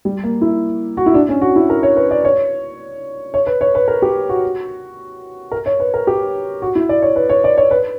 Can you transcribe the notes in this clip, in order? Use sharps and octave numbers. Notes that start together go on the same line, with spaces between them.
G3
A#3
E4
F#4
E4
D4
C#4
F#4
E4
A#4
C#5
B4
D5
C#5
C#5
B4
C#5
B4
A#4
G4
F#4
A#4
C#5
B4
A#4
G4
F#4
E4
D5
C#5
B4
C#5
D5
C#5
B4